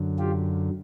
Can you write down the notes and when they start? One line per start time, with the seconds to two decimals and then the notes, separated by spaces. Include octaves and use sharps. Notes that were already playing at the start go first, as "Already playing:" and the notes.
Already playing: F#2 D3 F#3
0.19 F4 G4